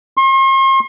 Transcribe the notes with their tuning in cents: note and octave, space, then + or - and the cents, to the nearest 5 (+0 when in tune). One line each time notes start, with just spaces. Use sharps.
C6 +45